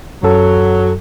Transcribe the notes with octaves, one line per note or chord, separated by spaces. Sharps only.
F#2 F#3 A4